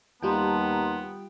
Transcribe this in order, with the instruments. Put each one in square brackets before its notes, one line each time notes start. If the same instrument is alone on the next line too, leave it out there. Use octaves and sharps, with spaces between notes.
[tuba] D#2 [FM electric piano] G3 F4 G5 [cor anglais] B3 [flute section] A5 A#5 C6